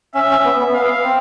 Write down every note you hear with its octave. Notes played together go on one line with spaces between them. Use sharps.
C#4 E5
C#4
B3
B3
B3 F5
C4